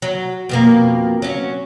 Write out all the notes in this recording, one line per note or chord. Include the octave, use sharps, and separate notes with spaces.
F#3
F2 B2 A#3
F#3 C#4